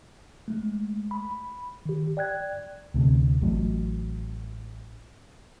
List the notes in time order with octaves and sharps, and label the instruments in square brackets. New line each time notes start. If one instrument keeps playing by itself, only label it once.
[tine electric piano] G#3 A3
B5
D#3 G4
D5 G5 F#6 G#6
[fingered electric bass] D2 C3
A1 A2 F#3